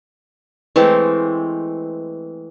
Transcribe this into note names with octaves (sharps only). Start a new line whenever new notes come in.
E3 G#3 A3 C4